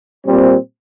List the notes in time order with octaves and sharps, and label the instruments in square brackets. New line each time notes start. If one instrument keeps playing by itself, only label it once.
[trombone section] A#2 G3 C4